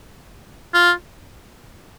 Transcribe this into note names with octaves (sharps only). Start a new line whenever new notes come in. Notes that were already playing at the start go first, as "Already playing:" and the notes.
F4